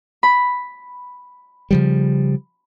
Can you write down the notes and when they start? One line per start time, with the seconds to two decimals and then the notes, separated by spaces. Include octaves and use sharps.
0.23 B5
1.71 C#3 F3 G3